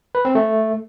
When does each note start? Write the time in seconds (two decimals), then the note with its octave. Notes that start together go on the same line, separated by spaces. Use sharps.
0.15 B4
0.25 C4
0.35 A3